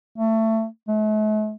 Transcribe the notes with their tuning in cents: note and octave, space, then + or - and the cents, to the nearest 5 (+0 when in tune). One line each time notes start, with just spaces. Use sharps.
A3 +20
A3 -45